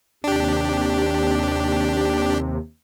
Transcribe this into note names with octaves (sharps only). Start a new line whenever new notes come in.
D#2 C3 D4 G4